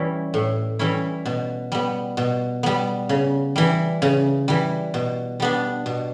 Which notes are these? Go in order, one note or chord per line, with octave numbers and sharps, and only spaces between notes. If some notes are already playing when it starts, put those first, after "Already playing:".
Already playing: E3 G3 C#4 E4
A2
E3 G3 C#4 E4
B2
G3 B3
B2
G3 B3
C#3
E3 G3
C#3
E3 G3
B2
G3 B3 D4
B2